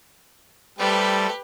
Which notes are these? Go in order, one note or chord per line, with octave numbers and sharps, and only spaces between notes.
G3 A3 G4 A4 B4 C5